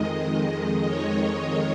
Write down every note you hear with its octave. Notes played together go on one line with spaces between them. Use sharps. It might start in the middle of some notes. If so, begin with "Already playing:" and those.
Already playing: F2 D#3 G#3 D#5
D#5
C#5